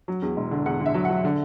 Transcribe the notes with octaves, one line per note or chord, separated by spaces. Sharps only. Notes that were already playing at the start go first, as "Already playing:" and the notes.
F#3
E2
E1
D3
E2 F#5
D3
E5
F#3
F#3 F#5
D3